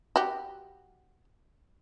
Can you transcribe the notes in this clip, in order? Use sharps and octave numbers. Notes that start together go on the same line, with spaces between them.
F#4 G4